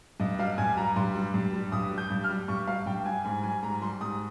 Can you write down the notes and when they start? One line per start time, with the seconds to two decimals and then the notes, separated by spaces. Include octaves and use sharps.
0.20 G2 D#5
0.39 G3 F5
0.58 G2 G#5
0.77 G3 A#5
0.96 G2 C6
1.15 G3
1.34 G2
1.53 G3
1.72 G2 D#6
1.91 G3
1.98 G6
2.10 G2
2.24 F6
2.30 G3
2.48 G2 C#6
2.68 G3 F5
2.86 G2 G5
3.06 G3 G#5
3.25 G#2 G#5
3.43 G3 G#5
3.63 G#2 A#5
3.81 G3 C6
4.01 G#2 D#6